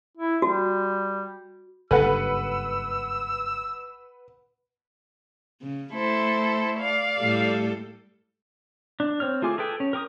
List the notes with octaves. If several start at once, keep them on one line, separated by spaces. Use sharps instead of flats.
E4
G3 F#4
F#1 G2 A4 B4 F#5 E6
C#3
A3 E4 A4 C5
D5 F5
A2 G3 A4
D4
C4 C#5 F6
A3 F4 G#4 G#5 D6
G#4 A4 B4 G5
C#4
A#4 G5 D6 D#6